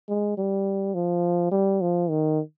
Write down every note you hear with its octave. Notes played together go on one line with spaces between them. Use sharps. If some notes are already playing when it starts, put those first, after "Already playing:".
G#3
G3
F3
G3
F3
D#3